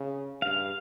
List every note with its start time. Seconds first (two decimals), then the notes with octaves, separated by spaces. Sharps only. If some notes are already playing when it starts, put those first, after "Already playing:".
Already playing: C#3
0.42 G2 F5